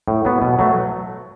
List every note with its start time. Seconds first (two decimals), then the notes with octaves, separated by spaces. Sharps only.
0.08 A2
0.25 F#3 B3
0.42 B2
0.59 F#3 A3